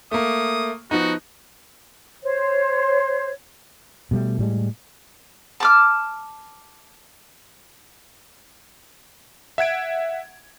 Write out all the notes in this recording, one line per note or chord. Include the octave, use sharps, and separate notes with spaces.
A3 A#3 D#6
F3 B3 D#4 F#4
C5 C#5
B2 G3 A3
A2 G3 G#3
A5 D6 F6
E5 F#5 G#6 D7